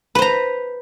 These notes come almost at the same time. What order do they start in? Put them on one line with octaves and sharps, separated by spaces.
B4 C5 A#5